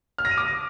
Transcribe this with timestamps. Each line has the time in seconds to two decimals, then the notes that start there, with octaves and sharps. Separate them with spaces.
0.18 F6
0.25 A#6
0.31 D#7
0.38 D6